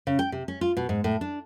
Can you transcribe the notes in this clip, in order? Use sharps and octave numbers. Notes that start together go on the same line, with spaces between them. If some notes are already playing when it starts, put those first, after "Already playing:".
C#3
G5
C3
C#4
F4
B2
G#2
A2
D4